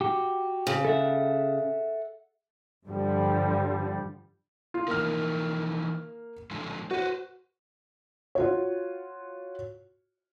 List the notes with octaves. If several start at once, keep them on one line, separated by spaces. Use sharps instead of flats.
F#4 G4
C#3
A4 E5 F#5
G2 D3 F3 G3
F4
E3 F3 A#3 D#4 F6
D3 F3 G#3
F#4 B4 C5
F4 F#4 C#5